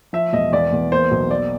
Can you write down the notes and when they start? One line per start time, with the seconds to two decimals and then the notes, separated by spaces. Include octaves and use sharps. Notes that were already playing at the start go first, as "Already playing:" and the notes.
0.13 F3 E5
0.33 E1 D#5
0.52 E2 D5
0.72 E2
0.92 A#3 C5
1.11 B1
1.31 A#3 D5